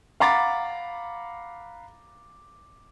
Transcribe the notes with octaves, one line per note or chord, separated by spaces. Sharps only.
F5 F#5 A#5 B5 D6 A6